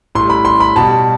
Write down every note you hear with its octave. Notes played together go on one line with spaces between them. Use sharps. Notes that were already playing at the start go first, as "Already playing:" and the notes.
A2 G3 C6
B5
C6
B5
B2 G3 A5